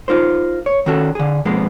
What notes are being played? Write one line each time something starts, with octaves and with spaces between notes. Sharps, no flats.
D#4 F4 A#4 C5
C#5
D#3 C#4 F#4 A4
D3 G#4
F2 G#2 B2 G#3 A#3 B3